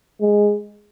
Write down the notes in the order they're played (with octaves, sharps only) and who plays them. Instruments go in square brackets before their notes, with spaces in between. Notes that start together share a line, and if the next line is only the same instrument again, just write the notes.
[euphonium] G#3